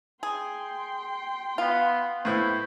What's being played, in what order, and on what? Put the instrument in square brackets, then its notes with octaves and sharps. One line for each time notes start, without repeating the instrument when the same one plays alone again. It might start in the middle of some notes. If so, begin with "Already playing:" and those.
[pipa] G#4 [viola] G5 C6
[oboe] B3 [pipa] F4
[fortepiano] A2 B3 E4 [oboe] C5